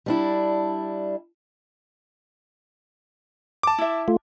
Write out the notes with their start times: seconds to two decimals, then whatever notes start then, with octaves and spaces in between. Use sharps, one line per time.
0.06 G3 D4 E4
3.63 A5 D6
3.78 E4 E5
4.08 A3 F4